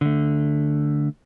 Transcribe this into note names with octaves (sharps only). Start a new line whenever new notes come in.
D3 A3